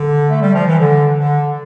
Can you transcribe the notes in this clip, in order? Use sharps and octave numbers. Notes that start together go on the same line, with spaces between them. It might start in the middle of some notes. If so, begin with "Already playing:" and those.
Already playing: D3
A3
G3
F3
E3
D3
D3